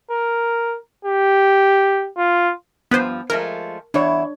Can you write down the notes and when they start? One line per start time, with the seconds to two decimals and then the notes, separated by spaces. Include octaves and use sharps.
0.11 A#4
1.05 G4
2.17 F4
2.91 G2 F3 B3 B4 C5
3.30 F3 G#3 A3 A#4
3.94 E2 D4 E4 C#5